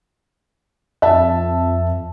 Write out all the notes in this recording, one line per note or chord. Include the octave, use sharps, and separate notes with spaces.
F2 E5 A5